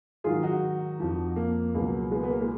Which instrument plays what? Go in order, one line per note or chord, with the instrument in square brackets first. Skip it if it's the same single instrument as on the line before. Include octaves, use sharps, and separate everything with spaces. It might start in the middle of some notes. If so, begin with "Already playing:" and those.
[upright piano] G#2 D#3 F#3 F4 G#4
D#4 F#4
F2 F3
A#3
C#2 B2 F#3
G#3 B3
B3
A#3
G#3